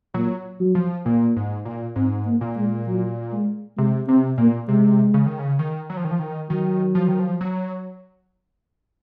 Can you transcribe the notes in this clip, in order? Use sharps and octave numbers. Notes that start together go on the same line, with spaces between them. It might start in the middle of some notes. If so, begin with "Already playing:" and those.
A#2 F#3
F#3
F3
A#2 A#3
G#2
A#2
G#2 C4
A#3
A#2
G#3
F#3
G#3
C3 G#3
C3 C4
A#2 A#3
C3 G#3
C#3
D#3
C#3
D#3
F#3
F3
D#3
F3
D#3
D#3 F#3
F3
D#3
F3
F#3